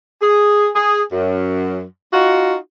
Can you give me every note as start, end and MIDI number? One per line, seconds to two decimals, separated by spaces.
0.21 0.68 68
0.75 1.01 68
1.12 1.84 42
2.12 2.56 63
2.12 2.56 65
2.12 2.56 66